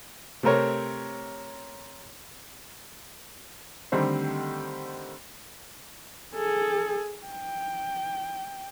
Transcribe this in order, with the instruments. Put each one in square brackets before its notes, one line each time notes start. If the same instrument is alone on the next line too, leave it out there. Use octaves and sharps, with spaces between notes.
[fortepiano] C3 A3 C4 A#4 C#5
[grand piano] D3 D#3 G3 A3 C4 C5
[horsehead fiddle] G#4 A4
G5